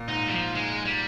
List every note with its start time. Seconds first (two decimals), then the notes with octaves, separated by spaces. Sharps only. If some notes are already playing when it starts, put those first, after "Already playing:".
Already playing: A#2
0.08 G#2 D#4
0.28 G3
0.31 F3
0.55 G#2 G#3
0.85 G3